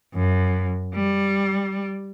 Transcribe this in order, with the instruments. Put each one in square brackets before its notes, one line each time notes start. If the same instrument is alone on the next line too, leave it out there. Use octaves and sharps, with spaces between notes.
[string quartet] F#2
G3